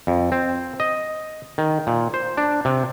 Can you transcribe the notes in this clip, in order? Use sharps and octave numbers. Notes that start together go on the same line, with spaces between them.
F2
C4
D#5
D#3
A#2
C5
D4
C3